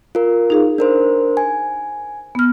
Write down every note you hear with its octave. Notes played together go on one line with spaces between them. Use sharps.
F4 A#4
D#4 G#4 F5
D4 A#4 C5
G#5
B3 F6